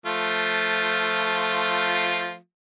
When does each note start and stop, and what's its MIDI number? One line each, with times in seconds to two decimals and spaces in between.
0.06 2.36 53
0.06 2.36 57
0.06 2.36 65